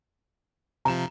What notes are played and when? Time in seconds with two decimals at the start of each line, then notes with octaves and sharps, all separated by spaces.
0.85 C3 F3 A#5 E7